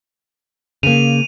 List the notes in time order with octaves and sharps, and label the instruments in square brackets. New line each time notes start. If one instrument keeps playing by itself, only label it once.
[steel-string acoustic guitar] C#3 A#3 [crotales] D#7 F7